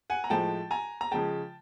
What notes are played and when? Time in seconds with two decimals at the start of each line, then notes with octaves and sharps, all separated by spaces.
0.10 F#5 G#5
0.24 A#5
0.30 A2 F3 G#3 G5 A5
0.71 G#5 A#5
1.01 A#5
1.11 C#3 F3 G#3 G5 A5